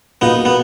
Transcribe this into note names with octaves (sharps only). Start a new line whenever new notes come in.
B2 A#3 B3 D#4 F4 A#4
B3